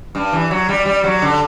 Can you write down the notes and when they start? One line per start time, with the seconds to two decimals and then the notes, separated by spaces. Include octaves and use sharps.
0.15 G2
0.32 E3
0.51 F#3
0.69 G3
0.86 G3
1.04 F#3
1.22 D3